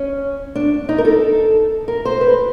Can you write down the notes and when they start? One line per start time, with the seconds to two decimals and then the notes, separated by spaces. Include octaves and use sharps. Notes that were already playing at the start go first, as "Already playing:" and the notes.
Already playing: C#4
0.55 D4
0.89 D#4
0.98 A#4
1.05 A4
1.88 A#4
2.05 C5
2.21 B4